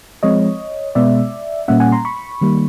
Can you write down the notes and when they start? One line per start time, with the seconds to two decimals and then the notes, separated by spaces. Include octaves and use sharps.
0.23 F3 G#3 C4 C#5 D#5
0.95 B2 G#3 B3 D5 E5
1.68 A#2 G3 A#3 C#4 E5 F#5
1.80 F#5 G#5
1.92 A#5 C6
2.05 B5 C#6
2.41 D#3 G3 A#3